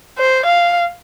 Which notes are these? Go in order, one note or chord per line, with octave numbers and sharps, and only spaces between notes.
C5
F5